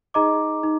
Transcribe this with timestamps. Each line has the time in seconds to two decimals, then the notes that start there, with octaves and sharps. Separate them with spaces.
0.14 D#4 G#4 D#5 A#5 D6
0.63 D#4